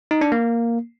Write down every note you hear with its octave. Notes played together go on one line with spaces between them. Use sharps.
D#4
D4
A#3